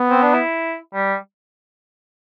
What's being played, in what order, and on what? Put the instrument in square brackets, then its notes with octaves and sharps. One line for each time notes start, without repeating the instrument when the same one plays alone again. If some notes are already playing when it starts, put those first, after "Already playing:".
Already playing: [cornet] B3
[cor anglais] C4
D4
E4
G3